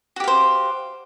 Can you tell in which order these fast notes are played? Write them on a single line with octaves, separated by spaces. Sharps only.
F#4 G4 F5 C5